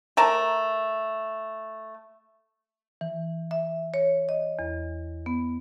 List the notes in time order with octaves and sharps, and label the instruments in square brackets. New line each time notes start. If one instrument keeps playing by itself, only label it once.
[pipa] A3 A#4 A5
[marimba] E3
E5
C#5
D#5
E2
B3